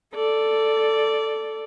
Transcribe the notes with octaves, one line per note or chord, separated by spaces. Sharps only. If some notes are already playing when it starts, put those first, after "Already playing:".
A4 D5